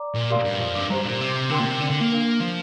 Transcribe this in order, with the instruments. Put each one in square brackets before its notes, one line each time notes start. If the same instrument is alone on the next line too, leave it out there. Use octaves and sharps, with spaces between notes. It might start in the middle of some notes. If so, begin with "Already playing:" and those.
Already playing: [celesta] D5 A#5 D6
[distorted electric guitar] A#2
[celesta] G4 A#4 D5 F5 C6
[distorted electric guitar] G2
F2
G2
[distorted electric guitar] G2 [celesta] G4 C5 A#5
[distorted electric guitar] A#2
C3
[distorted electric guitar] D3 [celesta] A#4 G5 C6
[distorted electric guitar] A#2
C3
D3
D3
A#3
[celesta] D4 A#4 F5
[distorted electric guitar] F3